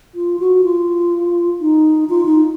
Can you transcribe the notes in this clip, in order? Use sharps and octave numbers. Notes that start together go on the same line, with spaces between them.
F4
F#4
F4
D#4
F4
D#4